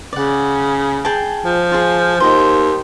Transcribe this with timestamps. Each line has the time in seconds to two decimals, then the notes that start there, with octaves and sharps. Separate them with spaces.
0.13 C#3 D5 F#5
1.05 G#4 G5 A5
1.43 F3
1.72 F4 G#4
2.20 D#2 C5 D#5